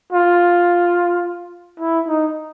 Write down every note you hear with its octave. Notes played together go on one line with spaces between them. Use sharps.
F4
E4
D#4